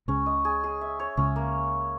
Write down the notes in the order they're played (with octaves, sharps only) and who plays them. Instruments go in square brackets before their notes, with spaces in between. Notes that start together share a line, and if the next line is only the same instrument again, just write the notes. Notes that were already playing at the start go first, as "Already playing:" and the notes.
[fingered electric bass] C#2 C#3 [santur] C#4
[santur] D#5
G#4
G#4
E5
C#5
[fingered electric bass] C#2 C#3 [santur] C#4
[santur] A#3